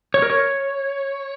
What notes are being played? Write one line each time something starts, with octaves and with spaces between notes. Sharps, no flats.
C#5
A#4
C#5